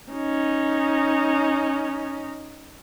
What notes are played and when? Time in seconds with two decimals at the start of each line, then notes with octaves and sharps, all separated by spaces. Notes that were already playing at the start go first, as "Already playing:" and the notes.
0.12 C#4 D#4